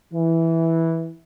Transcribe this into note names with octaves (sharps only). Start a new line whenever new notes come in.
E3